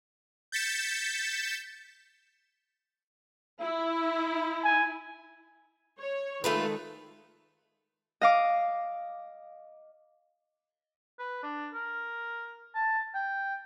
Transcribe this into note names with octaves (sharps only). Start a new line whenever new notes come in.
G6 A6 B6 C#7 E7
E4 E5
G#5
C#5
D#3 G#3 A3 F4 A4 B4
D#5 F5 D6
B4
D4
A#4
A5
G5